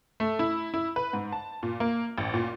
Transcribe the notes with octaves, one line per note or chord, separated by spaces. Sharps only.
A3
E4
E4
B4
G#2
A5
A#2
A#3
A1
A#2